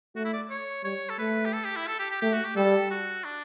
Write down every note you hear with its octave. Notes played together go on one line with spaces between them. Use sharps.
A3 F#4
E4
D5
C#5
G3 C#5
A4
A3 B4
G4
A4
G4
E4
A4
G4
G4
A3 G4
F#4
G4
G3 A4
F#4
D4